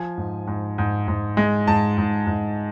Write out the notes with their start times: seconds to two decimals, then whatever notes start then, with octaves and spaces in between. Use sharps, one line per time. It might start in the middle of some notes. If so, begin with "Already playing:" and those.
Already playing: F3 G#5
0.18 G#2
0.47 G#2
0.78 G#2
1.08 G#2
1.37 G#3
1.67 G#2 A5
1.98 G#2
2.27 G#2